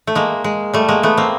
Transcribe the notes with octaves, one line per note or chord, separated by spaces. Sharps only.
A3
G#3 A#3
G#3
G3 A3
G#3 A#3
A3 B3
A#3 C4